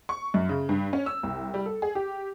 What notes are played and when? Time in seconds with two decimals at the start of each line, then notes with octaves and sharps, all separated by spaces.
0.09 C#6
0.34 F#2
0.49 C#3
0.69 G2
0.93 C#4
1.06 E6
1.23 C2
1.54 G3
1.66 A4
1.82 G#4
1.95 G4